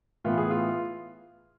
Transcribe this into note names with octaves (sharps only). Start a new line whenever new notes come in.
A2 E3 B3 F4
G#4
F4